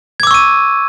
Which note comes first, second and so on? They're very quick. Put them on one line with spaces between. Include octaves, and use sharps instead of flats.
G#6 D6 E6 C#6 D#7